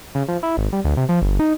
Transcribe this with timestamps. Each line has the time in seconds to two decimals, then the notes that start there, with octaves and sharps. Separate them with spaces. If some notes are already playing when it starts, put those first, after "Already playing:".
0.15 C#3
0.28 F3
0.43 E4
0.57 G#1
0.73 G3
0.84 D2
0.97 C3
1.09 F3
1.22 G1
1.39 D#4